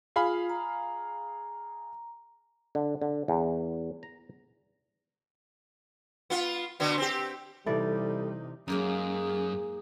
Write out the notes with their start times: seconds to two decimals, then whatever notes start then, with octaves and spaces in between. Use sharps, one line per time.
0.16 F4 G#4 F5 B5
0.50 A#5
2.75 D3
3.02 D3
3.28 E2
4.03 A#5
6.30 B3 F4
6.80 B2 D3 B3
6.98 C4 G4
7.66 C3 E3 G3 D#4 A4 D5
8.68 F#2 F#3 G#3 A#3 C#4 D#4 G#4